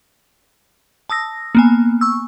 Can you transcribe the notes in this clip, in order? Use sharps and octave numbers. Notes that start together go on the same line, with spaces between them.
A5 D#6 E6 A#6
A#3 B3 G#5
C#6 E6